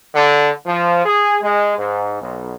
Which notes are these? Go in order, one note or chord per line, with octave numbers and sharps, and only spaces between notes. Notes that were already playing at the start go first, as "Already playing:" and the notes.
D3
F3
G#4
G#3
G#2
B1